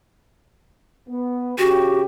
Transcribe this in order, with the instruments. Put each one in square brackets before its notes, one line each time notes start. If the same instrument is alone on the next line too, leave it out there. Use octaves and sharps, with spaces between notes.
[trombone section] B3
[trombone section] C#3 G4 [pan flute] F#4